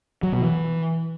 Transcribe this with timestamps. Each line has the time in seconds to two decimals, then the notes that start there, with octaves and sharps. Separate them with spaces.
0.23 F#3
0.32 B2
0.41 E3